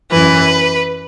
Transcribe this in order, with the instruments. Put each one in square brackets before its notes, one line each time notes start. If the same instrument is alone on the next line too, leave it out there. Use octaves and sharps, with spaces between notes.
[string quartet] F#2 E3 B4